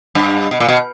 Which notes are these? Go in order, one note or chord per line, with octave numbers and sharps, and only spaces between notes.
G2
B2
A#2
B2